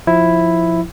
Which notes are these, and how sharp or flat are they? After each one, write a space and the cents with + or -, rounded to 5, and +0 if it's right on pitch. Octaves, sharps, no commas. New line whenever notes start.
F3 +0 E4 +0